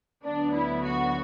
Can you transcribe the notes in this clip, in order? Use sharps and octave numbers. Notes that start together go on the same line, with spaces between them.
D2 D3 F#3 B3 D4
E4
F#4